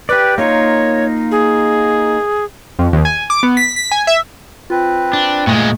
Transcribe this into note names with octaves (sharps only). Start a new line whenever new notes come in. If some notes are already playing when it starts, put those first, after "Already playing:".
G4 B4 D5
A#3 D#4 F4 C#5
G#4
F2
D#2
G#5
D6
B3
B6
B6
G#5
E5
C4 F4 B4
D4
A#2 G#3 A3